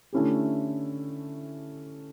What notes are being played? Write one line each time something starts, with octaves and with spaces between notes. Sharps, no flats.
D3 A3 C#4 E4 G4